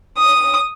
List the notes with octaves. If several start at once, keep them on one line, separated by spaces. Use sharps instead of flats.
D#6